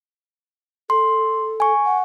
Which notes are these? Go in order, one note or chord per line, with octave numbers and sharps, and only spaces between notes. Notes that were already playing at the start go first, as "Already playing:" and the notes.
A4 C6
G#5 C#6
F#5